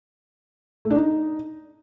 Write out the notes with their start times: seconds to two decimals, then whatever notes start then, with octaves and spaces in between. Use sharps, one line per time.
0.85 A3
0.90 D4
0.96 D#4